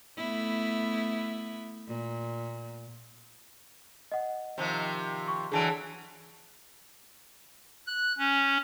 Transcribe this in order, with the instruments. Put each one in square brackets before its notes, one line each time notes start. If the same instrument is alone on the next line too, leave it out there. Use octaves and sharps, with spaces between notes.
[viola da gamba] A3 B3 E4
A#2
[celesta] D#5 F#5
[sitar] C3 D#3 F3
[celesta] C#6
[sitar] D3 E3 F#3 [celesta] G#4 A5 D7
[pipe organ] F#6
C#4